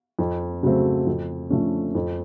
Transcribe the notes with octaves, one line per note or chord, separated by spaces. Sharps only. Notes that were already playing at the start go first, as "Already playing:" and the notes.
F2
C#3 F#3 A3 C4
F2
D3 F3 A3 C#4
F2